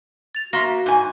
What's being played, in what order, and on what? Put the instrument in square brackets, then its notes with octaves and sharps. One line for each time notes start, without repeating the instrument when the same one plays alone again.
[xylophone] A6 F7
[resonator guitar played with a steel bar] A#3 [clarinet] F#4 [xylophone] E5 C6 A#6
[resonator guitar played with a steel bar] G#2 G#5